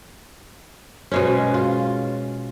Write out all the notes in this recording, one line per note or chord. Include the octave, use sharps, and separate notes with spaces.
B2 G#3 C#4
F4